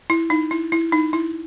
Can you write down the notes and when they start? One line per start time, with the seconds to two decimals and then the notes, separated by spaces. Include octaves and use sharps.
0.10 E4
0.30 D#4
0.51 E4
0.72 E4
0.92 D#4
1.13 E4